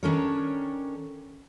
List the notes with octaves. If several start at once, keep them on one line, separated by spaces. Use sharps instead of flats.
D#3 C#4 D4 A4 A#4 C#5